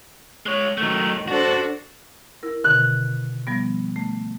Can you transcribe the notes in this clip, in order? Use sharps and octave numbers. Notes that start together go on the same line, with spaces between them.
G#3 C#5
D#3 F#3 A3
D4 F#4 A4 C5
E4 A#4
B2 D3 D#3 F#6
F3 G3 B3
A3